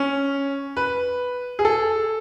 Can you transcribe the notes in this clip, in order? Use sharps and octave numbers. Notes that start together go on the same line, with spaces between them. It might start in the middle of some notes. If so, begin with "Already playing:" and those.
Already playing: C#4
B4
G#4
A4